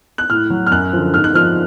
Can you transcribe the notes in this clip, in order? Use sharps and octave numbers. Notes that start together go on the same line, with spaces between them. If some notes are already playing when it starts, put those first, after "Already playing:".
F#6
A2 F6
F#3
F6
F#2 F#6
D3 F3
G#2 F6
F#6
F3 F6